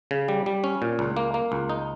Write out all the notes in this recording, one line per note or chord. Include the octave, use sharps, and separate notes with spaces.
C#3
G3
G3
C#4
A#2
C#2
A#3
A#3
C#2
D#4